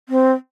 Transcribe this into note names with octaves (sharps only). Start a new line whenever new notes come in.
C4